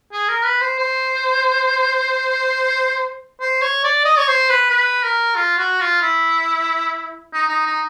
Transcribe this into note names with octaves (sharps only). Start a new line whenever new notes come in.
G#4
A#4
B4
C5
C5
C5
C#5
D5
D#5
C#5
C5
B4
B4
A#4
F4
F#4
F4
E4
D#4
D#4
D#4